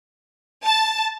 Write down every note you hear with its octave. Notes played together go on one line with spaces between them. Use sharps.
A5